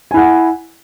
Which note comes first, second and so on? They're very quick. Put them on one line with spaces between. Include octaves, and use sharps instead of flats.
G#5 E4 F#5